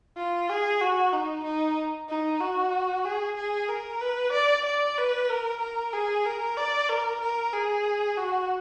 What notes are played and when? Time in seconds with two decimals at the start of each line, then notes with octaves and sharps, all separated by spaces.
0.17 F4
0.49 G#4
0.81 F#4
1.13 D#4
1.44 D#4
2.09 D#4
2.40 F#4
3.05 G#4
3.36 G#4
3.68 A#4
4.01 B4
4.33 D5
4.66 D5
4.98 B4
5.30 A#4
5.61 A#4
5.93 G#4
6.25 A#4
6.57 D5
6.89 A#4
7.21 A#4
7.53 G#4
8.17 F#4